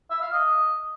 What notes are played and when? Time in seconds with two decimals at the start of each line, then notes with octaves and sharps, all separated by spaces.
0.10 E5
0.21 F5
0.32 D#5